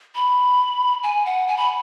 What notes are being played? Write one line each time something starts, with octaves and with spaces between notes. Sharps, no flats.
B5
G#5
F#5
G#5
B5